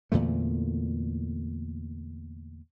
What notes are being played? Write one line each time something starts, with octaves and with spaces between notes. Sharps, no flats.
E2 A#2 D3 A3